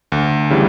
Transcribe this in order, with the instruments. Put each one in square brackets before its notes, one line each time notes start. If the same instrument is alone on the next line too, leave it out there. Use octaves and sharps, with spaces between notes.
[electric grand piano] D2
C#3 E3 G3